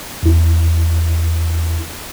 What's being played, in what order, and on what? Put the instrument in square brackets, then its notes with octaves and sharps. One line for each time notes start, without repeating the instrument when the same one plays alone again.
[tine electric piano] E2 E4